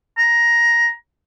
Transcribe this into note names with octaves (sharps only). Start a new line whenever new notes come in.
A#5